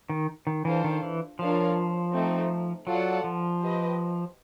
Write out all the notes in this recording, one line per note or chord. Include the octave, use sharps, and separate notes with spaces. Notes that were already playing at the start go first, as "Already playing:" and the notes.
D#3
D#3
E3 D4 F4 A4 C5 F5
D#3
E3
F3 D4 F4 A#4 C#5 F5
A3 C4 D#4
F#3 F4 A4 D5 F#5
F3
G4 B4 D#5